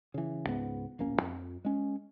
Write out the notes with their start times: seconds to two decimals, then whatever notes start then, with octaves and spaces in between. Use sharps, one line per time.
0.14 C#3 E3
0.45 C#2 G#2 B3
0.99 D1 A#1 A#3 C#4
1.21 F2
1.65 G#3 C#4